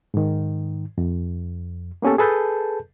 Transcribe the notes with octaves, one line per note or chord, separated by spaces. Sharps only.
G#2 D#3
F2
A#3 B3 C#4 G4 A4
G#4 A4 B4 A5 G6